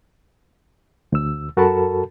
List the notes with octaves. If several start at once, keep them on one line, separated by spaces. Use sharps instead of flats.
D2 E6
F#2 F#4 A4 A#4 A5 B5